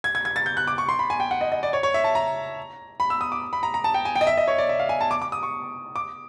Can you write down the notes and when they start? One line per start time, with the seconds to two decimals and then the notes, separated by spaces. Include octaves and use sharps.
0.04 G#6
0.15 G#6
0.25 G#6
0.36 A6
0.46 G6
0.57 F#6
0.68 D6
0.78 C#6
0.89 C6
0.99 B5
1.10 G#5
1.20 G5
1.31 F#5
1.41 D#5
1.52 D#5
1.63 D5
1.73 C#5
1.83 C#5
1.94 E5
2.04 A5
2.15 A#5
3.00 B5
3.10 E6
3.21 D#6
3.32 D6
3.53 B5
3.63 A#5
3.74 A#5
3.84 A5
3.94 G5
4.05 G#5
4.16 G5
4.21 D#5
4.27 E5
4.37 D#5
4.48 C#5
4.58 D5
4.69 E5
4.79 F5
4.89 G#5
5.01 A5
5.11 D6
5.22 D6
5.32 D#6
5.43 C#6
5.96 D6